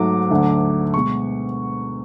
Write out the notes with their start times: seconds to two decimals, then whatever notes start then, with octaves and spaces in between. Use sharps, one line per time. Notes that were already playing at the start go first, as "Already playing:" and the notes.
Already playing: G#2 F#3 A3 D6
0.31 D2 D3 F#3 A3
0.94 B2 G#3 C#6